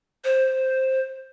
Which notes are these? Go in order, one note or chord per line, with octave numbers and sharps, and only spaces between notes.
C5